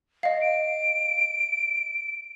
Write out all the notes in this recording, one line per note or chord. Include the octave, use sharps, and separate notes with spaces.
D#5 F5
D7